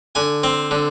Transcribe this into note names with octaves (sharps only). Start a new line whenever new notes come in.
D3 G#5
C4
D3